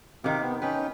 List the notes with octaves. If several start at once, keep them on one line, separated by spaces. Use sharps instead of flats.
C3 D#3 F5 D6
B3
C#4 D#4 B4 G5